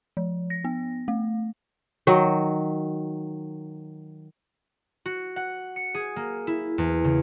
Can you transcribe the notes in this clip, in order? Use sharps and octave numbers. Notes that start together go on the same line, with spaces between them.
F3
A#6
B3
A3
D#3 F#3
F#4
F#5
C#7
G#4
A#3
E4
E2
C#3